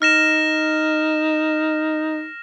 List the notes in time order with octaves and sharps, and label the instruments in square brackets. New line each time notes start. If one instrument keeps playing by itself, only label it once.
[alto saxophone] D#4 [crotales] F6 A#6 E7